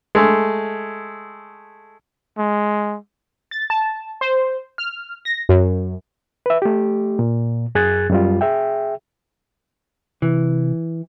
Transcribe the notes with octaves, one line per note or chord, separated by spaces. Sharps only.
G#3 A3
G#3
A6
A5
C5
F6
A#6
F#2
B4 E5
A3 G4
A#2
F#2 G#4 F#6 G#6 A6
F#2 G3 F4
G#4 E5 G5
C3 E3